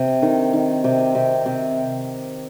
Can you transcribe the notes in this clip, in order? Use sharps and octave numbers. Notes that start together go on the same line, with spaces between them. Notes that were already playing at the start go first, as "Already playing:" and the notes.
Already playing: C3
D#3
D#3
C3
C3
C3